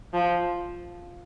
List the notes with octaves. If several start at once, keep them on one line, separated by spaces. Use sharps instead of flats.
F3